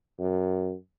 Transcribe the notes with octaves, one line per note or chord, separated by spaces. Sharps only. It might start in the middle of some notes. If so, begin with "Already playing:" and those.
F#2